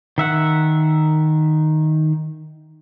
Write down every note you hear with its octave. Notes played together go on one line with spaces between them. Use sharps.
D#3 E5 F#5